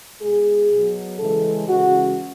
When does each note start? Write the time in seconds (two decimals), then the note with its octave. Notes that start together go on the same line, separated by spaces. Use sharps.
0.22 B2 G#3 G#4
0.72 B2 F#3
1.19 C#3 E3 G#3 A4
1.68 C#3 E3 G#3 F#4